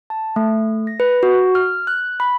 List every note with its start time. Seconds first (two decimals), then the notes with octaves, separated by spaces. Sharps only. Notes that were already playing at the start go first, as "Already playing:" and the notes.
0.10 A5
0.36 A3
0.87 A#6
1.00 B4
1.23 F#4
1.55 F6
1.87 F#6
2.20 B5